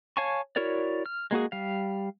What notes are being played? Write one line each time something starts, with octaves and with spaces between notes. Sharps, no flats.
C#5 F5 G#5 A5 C#6
E4 F#4 A#4 C#5 D5
F6
G#3 A#3 F#4 G#4
G3 F5